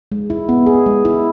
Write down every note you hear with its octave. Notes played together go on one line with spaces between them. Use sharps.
G#3
E4
B3
G#4
G#3
E4